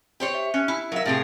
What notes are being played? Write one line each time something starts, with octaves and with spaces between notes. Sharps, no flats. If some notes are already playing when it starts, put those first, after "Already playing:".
G4 C5 C#5
E5
C#4 F#6 C#7
E4
F#3 A#4 E5 F5
A2 C3 G#4